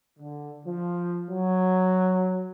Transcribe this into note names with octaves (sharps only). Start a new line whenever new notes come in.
D3
F3
F#3